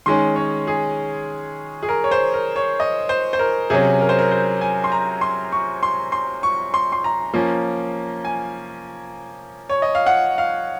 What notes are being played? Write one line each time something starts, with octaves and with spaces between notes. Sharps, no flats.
D#3 G#3 C#4 C6
C#5
G#4
G#4
A#4
C#5
C5
A#4
C#5
D#5
C5
C5
A#4
C3 F#3 C#4 G#4
A#4
C5
A#4
C5
G#5
C6
A#5
C6
C#6
C6
C6
C#6
C6
C6
A#5
F3 A#3 C#4
G#5
C#5
D#5
F5
F#5
F5